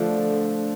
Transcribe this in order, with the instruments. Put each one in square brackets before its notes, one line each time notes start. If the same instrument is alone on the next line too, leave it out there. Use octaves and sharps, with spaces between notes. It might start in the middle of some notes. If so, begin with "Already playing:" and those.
Already playing: [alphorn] D3 [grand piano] F3 A3 D4